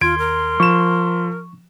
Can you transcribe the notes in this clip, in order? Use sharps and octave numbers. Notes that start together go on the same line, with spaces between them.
D#2 F4 C6 G#6 D7
A#4
F3 C#6 E7